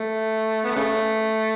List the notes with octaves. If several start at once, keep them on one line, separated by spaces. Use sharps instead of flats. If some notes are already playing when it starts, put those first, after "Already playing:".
Already playing: A3
B3
C#3 A3